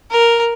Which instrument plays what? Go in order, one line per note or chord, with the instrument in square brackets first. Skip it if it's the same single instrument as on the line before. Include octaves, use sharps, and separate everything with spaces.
[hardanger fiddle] A#4